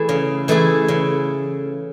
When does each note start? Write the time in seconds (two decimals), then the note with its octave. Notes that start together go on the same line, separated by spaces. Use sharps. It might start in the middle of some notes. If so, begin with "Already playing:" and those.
Already playing: E3 A3 E4 G#4
0.09 C#3
0.48 E3 A3 E4 G#4
0.88 C#3